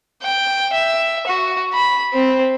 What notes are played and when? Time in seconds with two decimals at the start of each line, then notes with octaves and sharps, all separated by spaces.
0.23 G5
0.73 E5
1.27 F#4
1.73 B5
2.13 C4